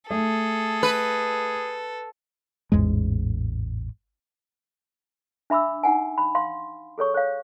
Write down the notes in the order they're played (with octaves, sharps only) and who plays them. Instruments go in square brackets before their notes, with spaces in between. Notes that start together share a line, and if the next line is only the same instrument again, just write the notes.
[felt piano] A3 [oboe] G#4 [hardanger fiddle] A4
[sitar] B4
[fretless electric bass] A1 E2 G#2 G#3
[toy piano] D4 E5 B5 D6 E6
D#4 F#5 G#5
B5
F5 C6
G#4 A4 C#5 C#6
C5 C#5 F5